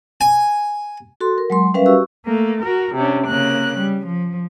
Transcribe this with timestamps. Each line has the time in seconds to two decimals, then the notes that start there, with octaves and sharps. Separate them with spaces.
0.21 G#5
1.21 F#4 A4 C6
1.38 A#4
1.50 F#3 G#3 C6
1.74 G3 C#4 A#4 B4 E5 F5
1.86 F#4 G4 C#6 E6
2.25 A3 A#3
2.62 F#4 A#4
2.95 C3 C#4 D4
3.26 C#3 A#3 F#6
3.78 G3
4.06 F3